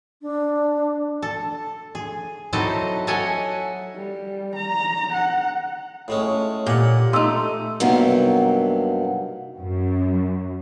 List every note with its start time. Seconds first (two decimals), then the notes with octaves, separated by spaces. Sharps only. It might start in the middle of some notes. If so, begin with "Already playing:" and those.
0.22 D4
1.22 A4
1.95 G#4
2.53 F#3 C4 D#4 E4 A4 D#5
3.07 A4 C#5 D#5 E5 F#5 G#5
3.96 G3
4.56 A#5
5.13 F#5
6.08 A2 G#3 C#4
6.67 A#2 G4 F#5
7.13 A3 D#4 C6 E6
7.80 G2 C3 F#3 A#3 B3 D#4
9.58 F#2